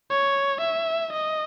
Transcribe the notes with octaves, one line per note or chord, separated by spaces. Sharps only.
C#5
E5
D#5